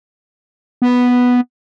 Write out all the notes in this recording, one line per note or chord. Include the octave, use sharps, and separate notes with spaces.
B3